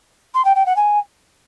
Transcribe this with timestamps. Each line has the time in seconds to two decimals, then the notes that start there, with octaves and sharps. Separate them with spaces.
0.34 C6
0.44 G5
0.55 G5
0.65 F#5
0.76 G#5